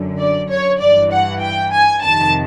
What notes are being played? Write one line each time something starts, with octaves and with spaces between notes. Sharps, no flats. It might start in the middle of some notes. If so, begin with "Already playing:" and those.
Already playing: F#2 D3
D5
C#5
G2 E3 D5
F#5
G5
G#5
F2 C3 D#3 A5